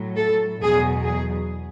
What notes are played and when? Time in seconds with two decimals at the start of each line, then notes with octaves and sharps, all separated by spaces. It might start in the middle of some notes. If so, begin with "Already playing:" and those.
Already playing: A2 F#3
0.17 A4
0.61 E2 B2 F#3 G#4
1.04 G#4